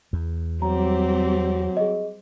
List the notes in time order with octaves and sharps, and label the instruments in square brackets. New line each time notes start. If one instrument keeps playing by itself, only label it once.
[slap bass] E2
[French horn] F#3 [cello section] G3 C4 G4 [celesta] A#5
[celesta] G#4 D#5